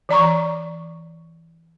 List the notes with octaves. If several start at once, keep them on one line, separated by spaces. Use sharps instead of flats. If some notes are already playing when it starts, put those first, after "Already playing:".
E3 D5 A#5 C#6